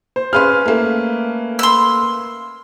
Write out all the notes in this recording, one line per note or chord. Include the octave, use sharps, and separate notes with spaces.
C5
C#4 G#4 B4 F5 C6 F6
A3 A#3
C6 E6